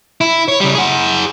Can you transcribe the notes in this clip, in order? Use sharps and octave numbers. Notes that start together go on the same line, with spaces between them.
E4
C#5
C#3 G3
G#4 F#5